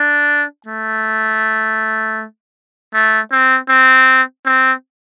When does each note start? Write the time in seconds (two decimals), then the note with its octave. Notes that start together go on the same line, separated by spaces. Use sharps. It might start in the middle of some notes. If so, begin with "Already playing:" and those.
Already playing: D4
0.66 A3
2.94 A3
3.32 C4
3.69 C4
4.46 C4